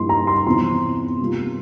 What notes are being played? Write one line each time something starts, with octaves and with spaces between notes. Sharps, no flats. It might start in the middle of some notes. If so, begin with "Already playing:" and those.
Already playing: G2 F3 A#3 E4 C6
A#5
C6
E2 C3 F3 C4 E4 C6
C3 G3 A#3 F4